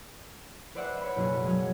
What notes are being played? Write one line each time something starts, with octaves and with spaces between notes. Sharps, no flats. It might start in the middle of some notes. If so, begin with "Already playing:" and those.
B4 C5 D5 E5 F#5
C#5 B5
F#1 B2 F#4 G#4
F#3 G#3